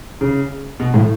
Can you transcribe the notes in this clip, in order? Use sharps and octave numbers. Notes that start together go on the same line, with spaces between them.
C#3
B2
A2